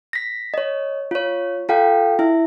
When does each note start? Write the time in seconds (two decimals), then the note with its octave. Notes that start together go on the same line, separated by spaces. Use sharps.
0.13 A#6 B6
0.54 C#5 D#5
1.11 F4 C#5
1.69 F4 A4 F5 G5
2.19 E4 E5